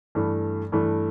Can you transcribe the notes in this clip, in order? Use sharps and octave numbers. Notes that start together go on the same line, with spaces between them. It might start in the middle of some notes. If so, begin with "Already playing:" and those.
G2 E3 A3
G2 E3 A3